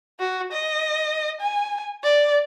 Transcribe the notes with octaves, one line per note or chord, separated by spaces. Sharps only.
F#4
D#5
G#5
D5